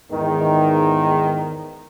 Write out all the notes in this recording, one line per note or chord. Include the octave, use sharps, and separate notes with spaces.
E2 G#2 D#3